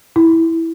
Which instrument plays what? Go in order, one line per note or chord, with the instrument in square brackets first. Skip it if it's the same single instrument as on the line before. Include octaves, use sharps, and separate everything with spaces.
[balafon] E4